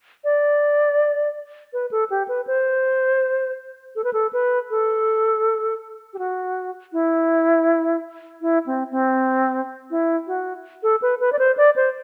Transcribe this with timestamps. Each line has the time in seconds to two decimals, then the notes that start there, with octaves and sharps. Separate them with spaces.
0.24 D5
1.73 B4
1.91 A4
2.10 G4
2.28 B4
2.47 C5
3.96 A4
4.04 B4
4.13 A4
4.33 B4
4.70 A4
6.14 G4
6.19 F#4
6.93 E4
8.41 E4
8.66 C4
8.91 C4
9.91 E4
10.27 F#4
10.83 A4
11.02 B4
11.20 B4
11.33 D5
11.39 C5
11.57 D5
11.76 C5